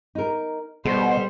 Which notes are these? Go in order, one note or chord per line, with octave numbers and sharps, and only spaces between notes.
D#4 A#4
B2 G3 A4 C5